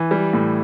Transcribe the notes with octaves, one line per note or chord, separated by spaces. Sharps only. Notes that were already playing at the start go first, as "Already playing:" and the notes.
Already playing: E3
G3
A2